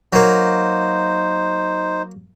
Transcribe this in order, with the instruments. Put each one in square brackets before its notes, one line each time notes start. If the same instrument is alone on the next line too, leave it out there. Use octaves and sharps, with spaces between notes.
[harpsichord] F#3 A#3 [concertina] D#4 C5